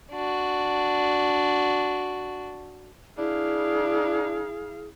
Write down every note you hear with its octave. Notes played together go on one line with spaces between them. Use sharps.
D4 F#4
D4 E4 G#4 F5